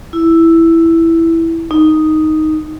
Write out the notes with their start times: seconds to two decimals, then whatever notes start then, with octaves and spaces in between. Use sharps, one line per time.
0.13 E4
1.71 D#4